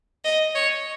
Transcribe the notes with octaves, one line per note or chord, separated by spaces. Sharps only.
D#5
C#5